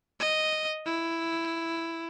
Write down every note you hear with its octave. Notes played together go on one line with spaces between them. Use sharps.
D#5
E4